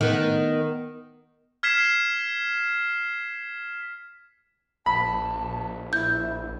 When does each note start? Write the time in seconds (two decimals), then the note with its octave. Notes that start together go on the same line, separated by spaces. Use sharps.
0.01 D#3 B3
1.63 F6 G#6 B6 C7 E7
4.86 A#1 A5 B5
5.93 E4 G6